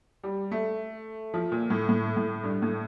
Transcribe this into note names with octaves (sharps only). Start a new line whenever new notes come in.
G3
A3
F3
A#2
A2
A2
A2
G2
A2